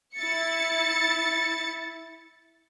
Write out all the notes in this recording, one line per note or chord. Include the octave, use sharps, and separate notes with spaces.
E4 A6 C#7